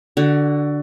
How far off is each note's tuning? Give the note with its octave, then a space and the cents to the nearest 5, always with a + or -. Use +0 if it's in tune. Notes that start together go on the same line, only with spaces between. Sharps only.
D3 +0 F#4 +20